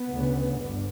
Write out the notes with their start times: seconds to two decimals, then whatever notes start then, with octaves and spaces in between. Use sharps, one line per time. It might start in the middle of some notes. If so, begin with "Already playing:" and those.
Already playing: B3
0.11 D2 C#3
0.58 G1 G2